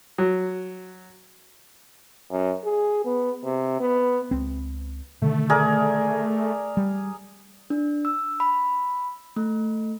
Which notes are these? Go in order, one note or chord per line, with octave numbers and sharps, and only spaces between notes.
F#3
F#2
G#4
B3
C3
B3
C#2 C4
B2 D3 D#3 A3
G#4 A#4 D5
G3
D4
E6
B5
A3